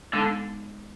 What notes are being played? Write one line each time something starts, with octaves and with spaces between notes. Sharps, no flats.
D3 G#3 B3 D#4